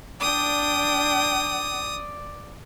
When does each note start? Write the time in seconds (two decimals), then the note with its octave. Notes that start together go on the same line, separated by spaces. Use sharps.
0.21 D4 D5 G5 D#6